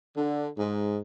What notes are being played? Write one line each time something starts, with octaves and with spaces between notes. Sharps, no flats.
D3
G#2